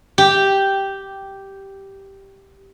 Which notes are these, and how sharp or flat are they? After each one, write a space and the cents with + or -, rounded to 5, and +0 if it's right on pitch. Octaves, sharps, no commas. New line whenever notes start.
G4 -5